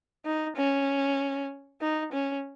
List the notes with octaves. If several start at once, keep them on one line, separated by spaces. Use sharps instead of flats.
D#4
C#4
D#4
C#4